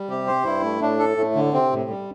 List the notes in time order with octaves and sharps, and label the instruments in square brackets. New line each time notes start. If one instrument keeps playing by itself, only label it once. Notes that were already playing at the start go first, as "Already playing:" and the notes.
Already playing: [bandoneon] G3
[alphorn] C3 [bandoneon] G4
[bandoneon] C5
[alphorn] G2 [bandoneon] E4
[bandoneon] A3
[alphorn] A2 [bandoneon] D4
[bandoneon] A4
[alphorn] A2 [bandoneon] A3
[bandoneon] D3
[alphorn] C3 [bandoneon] C4
[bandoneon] A2
G3